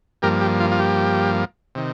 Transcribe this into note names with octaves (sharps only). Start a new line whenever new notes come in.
G2 F3 A#3 G4 A#4
G4
F4
F4
G4
C3 D#3